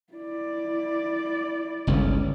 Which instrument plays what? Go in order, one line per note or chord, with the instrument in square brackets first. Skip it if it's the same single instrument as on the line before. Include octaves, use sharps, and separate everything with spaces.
[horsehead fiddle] E4 D5
[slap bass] G1 C#2 C#4